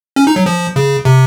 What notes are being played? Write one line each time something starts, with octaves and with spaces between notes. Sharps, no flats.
C#4
D#4
F#3
F3
C#3
C3